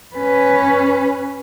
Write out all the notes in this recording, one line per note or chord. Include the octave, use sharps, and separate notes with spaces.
C#4 B4